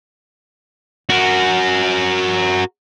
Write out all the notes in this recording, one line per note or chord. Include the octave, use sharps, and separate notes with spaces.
F#4 A#4